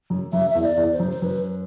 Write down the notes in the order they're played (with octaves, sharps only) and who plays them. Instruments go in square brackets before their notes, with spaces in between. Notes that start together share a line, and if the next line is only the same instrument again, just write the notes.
[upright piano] F#2
[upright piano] F#2 [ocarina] E5
[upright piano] E2 [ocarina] E5
[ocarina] D5
[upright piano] E2
[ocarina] C5
[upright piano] F#2
[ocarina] C5
[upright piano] F#2 [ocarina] B4